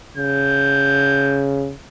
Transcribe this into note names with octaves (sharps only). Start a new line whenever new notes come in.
C#3 G6